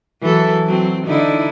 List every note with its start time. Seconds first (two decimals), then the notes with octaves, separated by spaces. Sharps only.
0.21 E3 F#3 A4
0.67 F#3 C4
1.07 D3 D#4 E4